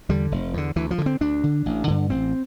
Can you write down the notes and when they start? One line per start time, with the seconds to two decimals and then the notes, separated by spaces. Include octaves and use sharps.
0.09 E2 D3 G3
0.32 F1
0.53 E2 D3
0.76 D2 E3
0.91 F3
0.98 D3
1.06 C4
1.21 D2 D4
1.44 D3
1.66 A1
1.87 G2 D3
2.10 A1 C4